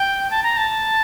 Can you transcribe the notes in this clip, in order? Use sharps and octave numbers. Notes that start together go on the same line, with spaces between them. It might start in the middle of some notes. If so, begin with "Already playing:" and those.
Already playing: G5
A5
A#5
A5